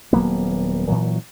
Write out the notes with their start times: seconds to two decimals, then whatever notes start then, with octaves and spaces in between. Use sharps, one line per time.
0.13 D#1 F#3 A#3 B3
0.88 A#2 E3 F#3